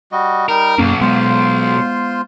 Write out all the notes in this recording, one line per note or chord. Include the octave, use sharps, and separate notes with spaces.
G3 F#4 D#5
G3 D#4 A#4
B1 F#2 A#3 C#4 F5
G#3 B3 F4 C5 C6